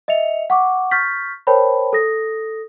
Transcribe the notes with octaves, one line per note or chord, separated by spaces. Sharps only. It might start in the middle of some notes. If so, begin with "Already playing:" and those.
D#5 E5 C#7 F7
F#5 C#6 D6
C#6 F6 G6 A6 B6
A#4 C5 C#5 G5 A5 B5
A4 D#6 A#6